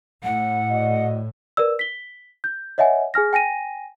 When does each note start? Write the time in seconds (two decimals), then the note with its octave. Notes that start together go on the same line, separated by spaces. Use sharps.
0.23 A2 F#5
0.70 F#4 D5 D#5
1.57 A#4 B4 D5 E6
1.79 B6 G7
2.44 G6
2.78 C#5 D#5 E5 F#5 G#5
3.14 G#4 G#5 F6 A#6
3.33 G5 G#5 A#6 D#7